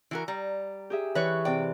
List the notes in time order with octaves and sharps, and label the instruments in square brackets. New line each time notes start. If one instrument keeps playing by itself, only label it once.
[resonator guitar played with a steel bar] E3 F#4 A#4
[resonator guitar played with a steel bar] G3 [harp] A#5
[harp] G4 G#4 E5
[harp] E3 C#6 F#6 [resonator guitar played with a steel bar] B4 C#5
[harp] C3 D5 [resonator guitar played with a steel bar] G5